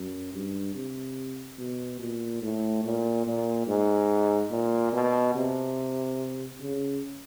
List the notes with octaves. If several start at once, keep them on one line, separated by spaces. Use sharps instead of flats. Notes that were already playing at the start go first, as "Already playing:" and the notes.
Already playing: F#2
G2
C3
B2
A#2
A2
A#2
A#2
G#2
A#2
B2
C3
C#3